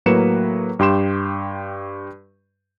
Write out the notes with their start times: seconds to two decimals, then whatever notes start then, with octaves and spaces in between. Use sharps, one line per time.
0.06 A2 F#3 A#3 B4 C#7 E7
0.79 G2 G4 C6 E7